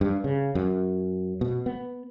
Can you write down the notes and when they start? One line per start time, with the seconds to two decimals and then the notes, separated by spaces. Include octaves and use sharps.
0.01 G2
0.24 C#3
0.55 F#2
1.41 B2
1.66 B3